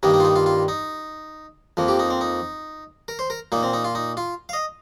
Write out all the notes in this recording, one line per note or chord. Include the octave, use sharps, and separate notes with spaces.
G2 D#3 G3 A#3 D#4
D#4
F4
D#4
F4
F4
D#4
F2 F3 A#3
G4
D#4
C4
D#4
A#4
C5
A#4
A#2 A#3 D#4
C4
D#4
F4
D#4
F4
F5
D#5